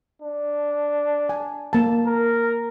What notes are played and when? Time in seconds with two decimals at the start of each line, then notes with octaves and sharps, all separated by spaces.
0.22 D4
1.29 G#5
1.73 A#3 A5
2.07 A#4